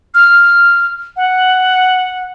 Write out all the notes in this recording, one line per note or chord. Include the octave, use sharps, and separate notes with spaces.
F6
F#5